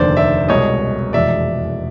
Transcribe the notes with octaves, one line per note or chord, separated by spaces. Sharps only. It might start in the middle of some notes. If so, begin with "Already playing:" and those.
Already playing: F1 D#2 D3 C5 D5
D5 E5
C2 B2 G#3 C#5 D#5
F1 E2 B2 G#3 D5 E5